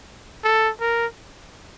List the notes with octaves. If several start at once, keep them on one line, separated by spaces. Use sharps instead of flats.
A4
A#4